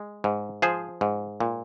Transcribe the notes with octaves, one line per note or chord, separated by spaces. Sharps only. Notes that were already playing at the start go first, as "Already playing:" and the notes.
Already playing: G#3
G#2
F3 G#4 C5
G#2
A#2